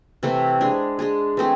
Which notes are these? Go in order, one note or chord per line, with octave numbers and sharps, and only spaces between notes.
C3 E3 A3 E4
G#3 D4 G#4
G#3 D4 G#4
E3 A3 C4 G#4